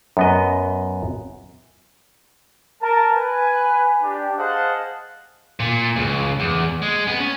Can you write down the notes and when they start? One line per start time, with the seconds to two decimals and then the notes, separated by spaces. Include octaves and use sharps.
0.17 F#2 B3 D#5
2.82 A#4 A5
3.12 B4 G#5
4.03 D4 G4
4.39 G#4 C5 D#5 F5 F#5 A5
5.60 A#2
5.96 C#2
6.40 E2
6.82 G#3
7.07 B3
7.19 C#4